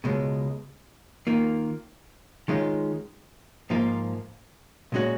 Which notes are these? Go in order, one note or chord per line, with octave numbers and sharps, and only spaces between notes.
C#2 B2 G#3
D#3 A#3 F4
D#3 G#3 C#4 F4
G#2 F3 A#3 F4
A#2 G#3 C#4 F#4